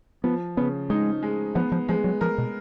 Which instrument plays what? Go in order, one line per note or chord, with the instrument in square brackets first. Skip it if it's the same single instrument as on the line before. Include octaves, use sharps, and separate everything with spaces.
[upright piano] F3 [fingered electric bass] B3
[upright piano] C#3 [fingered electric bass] B3
[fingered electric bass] G#3 [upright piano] D#4
[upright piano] G#3
[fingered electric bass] F3 [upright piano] B3
[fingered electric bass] F3
[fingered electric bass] F3 [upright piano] G#3
[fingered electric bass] F#3
[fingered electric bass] F3 [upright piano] A#4
[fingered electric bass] B2